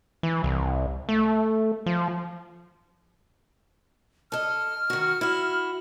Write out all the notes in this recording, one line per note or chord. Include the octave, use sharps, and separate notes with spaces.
E3
C2
A3
F3
A4 D#5 F6
D#3 F#4
E4 F#4